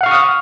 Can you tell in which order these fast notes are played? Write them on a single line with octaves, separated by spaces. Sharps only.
F#5 F5 C#6 F6 D#6